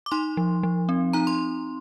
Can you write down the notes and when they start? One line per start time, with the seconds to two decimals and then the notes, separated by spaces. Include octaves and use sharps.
0.06 D6
0.11 D#4 C6
0.37 F3
0.63 F3
0.89 C4
1.13 D#4 A#5
1.27 C6